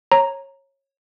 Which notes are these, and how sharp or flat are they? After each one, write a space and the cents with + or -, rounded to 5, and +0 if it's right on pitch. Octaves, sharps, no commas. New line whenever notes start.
C#5 -20 A#5 +0